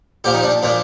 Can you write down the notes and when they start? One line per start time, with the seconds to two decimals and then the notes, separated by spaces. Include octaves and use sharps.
0.24 A#2 F3 G4
0.34 D#4
0.43 D4
0.63 A#2 F3 D4